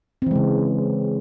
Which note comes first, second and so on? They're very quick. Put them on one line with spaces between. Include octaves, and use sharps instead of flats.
C4 E3 G#3 C#3